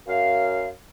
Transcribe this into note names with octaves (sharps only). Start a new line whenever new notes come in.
F#2 F5